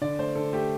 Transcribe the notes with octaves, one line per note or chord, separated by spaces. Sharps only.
D3 D5
A3 C5
D3 A4
A3 G4